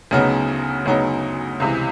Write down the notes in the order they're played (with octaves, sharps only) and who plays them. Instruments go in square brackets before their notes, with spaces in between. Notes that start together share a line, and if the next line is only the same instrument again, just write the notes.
[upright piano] D2 C#3 F#3 B3 D#4
D2 C#3 F#3 B3 D#4
C#2 C3 E3